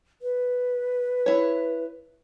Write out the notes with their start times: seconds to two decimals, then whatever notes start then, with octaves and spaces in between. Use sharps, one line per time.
0.22 B4
1.26 E4 C#5